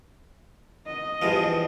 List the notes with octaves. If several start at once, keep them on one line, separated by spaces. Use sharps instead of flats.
D#5
E2 G2 F3